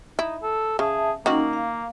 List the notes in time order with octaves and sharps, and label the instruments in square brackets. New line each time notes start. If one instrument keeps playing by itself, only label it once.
[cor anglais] D#4 [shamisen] E4
[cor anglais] A4
[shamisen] C#3 [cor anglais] G#4 [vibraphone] E5 A5
[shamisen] D#3 F#4 [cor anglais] A#3 [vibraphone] C#4 D#4
[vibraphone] F5